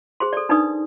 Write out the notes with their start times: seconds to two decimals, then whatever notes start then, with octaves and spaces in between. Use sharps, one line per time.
0.20 G#4 C5 C6
0.33 A4 D5
0.49 D4 D#4 B4 D5 D#6